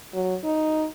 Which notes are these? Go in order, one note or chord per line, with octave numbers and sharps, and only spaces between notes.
F#3
D#4